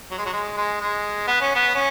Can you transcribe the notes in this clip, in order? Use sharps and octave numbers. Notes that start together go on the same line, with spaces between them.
F#3
G#3
F#3
G#3
G#3
G#3
B3
C#4
B3
C#4